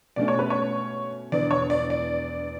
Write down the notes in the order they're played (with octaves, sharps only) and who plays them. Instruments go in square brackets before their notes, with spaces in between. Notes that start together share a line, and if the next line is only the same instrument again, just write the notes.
[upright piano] B2 A3 C#4 [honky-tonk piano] D5
[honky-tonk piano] C#5
B4
C#5
[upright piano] E1 E2 D3 [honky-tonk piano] D5
[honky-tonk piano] C#5
D5
D5